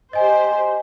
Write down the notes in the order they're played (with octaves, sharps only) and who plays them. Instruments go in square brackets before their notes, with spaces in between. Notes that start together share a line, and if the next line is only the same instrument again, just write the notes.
[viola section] G4 C5 [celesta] D#5 G#5